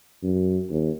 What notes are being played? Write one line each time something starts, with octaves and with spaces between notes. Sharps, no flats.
F#2
D#2